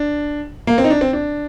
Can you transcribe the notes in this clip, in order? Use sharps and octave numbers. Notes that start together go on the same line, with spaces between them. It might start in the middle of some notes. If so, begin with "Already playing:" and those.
Already playing: D4
A#3
C4
D#4
D4
C4
D4